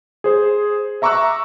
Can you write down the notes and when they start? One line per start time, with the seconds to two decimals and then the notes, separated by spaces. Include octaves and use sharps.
0.24 G#4 C5
1.02 E5 A#5 C#6 D6 E6 F#6